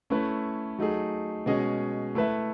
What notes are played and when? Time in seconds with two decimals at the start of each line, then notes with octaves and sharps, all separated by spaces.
0.10 A3 C#4 E4 B4
0.79 F#3 A3 D#4 G#4
1.46 B2 G#3 C#4 G#4 D#5
2.15 A3 E4 B4 E5